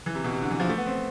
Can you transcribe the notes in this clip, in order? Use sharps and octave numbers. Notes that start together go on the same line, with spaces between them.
E3
C3
B2
C3
D3
E3
F3
A3
B3
C4